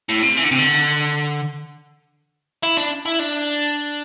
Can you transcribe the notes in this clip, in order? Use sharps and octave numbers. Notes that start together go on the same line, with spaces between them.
A2
C3
E3
D3
C3
D3
E4
D4
E4
D4